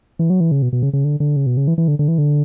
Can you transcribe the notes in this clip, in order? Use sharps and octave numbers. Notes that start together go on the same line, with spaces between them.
E3
F#3
E3
C#3
B2
B2
C#3
C#3
D3
D3
C#3
B2
C#3
E3
E3
D3
D3
E3
D3